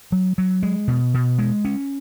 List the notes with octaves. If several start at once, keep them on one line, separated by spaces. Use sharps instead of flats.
F#3
F#3
G#3
B2
B2
G#3
C#4